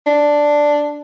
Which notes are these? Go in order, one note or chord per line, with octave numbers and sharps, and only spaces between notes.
D4